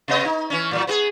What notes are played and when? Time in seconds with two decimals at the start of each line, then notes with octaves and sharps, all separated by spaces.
0.08 C3 B3 D#5
0.25 D#4
0.50 E3 C#4
0.71 A2 F3 F#3
0.87 B3 F#4 G#4